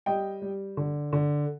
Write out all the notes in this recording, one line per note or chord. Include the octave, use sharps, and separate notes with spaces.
G3 D#5 G5
G3
D3
D3